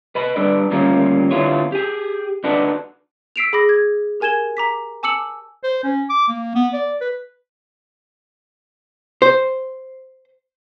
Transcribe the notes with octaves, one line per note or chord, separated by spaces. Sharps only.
B4 D#5 B5
G3 D4 A4 B4 D5
D2 D#3 G3 A#3 C#4 F4
D3 B3 E4 F4 C#5
G4 G#4
D4 D#4 F#4 A4 B4 D5
E6 B6 C7 D7 E7 F7
G#4 B5 D6 A#6
G#6
G4 A#4 G#5 G#6 E7 G7
A#5 D6 B6
G#5 A5 D6 E6 C#7 F#7
C5
C#4
D6
A#3
B3
D5
B4
C5